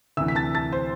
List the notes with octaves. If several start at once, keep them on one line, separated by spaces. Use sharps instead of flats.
D2 C3 E3 E5 E6
B6
A5 A6
A5 A6
C5 C6